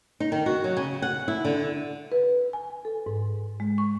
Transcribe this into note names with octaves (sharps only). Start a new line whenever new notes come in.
D#4
D#3
F#4
F#3
C#3
F#5
E4
D3
B4
G#5
A4
G#2
G#3
C#6